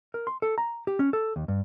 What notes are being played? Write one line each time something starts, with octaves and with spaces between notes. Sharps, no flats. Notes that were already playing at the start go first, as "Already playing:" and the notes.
A#4
C6
A4
A#5
G4
C#4
A4
D#2
G2